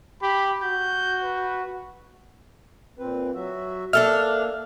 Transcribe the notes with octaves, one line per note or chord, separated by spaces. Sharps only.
G4 B5
F#4 G6
B4
A#2 C4 B4
F#3 F#4 E5
A#3 D4 A4 E5 F6